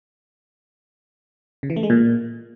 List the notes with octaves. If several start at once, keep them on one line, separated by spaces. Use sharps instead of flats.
C#3
E3
A3
G#3
A#2